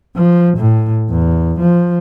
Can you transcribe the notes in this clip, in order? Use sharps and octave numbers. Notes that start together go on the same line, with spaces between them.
F3
A2
E2
F3